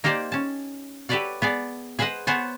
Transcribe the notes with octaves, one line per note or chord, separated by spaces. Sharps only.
A#3 D#4 G4 C5 D5
C#4 A5
G4 A4 B4 C#5 D5 F#5
B3 G#4 D5
G#4 B4 C5 D#5 F#5
B3 C5 C#5 F#5 G#5 A5